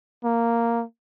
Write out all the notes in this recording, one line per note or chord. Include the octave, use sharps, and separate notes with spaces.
A#3